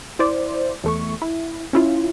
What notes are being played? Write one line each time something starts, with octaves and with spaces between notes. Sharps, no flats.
E4 C5 D5
E2 A3 C#6
E4
C#4 E4 F4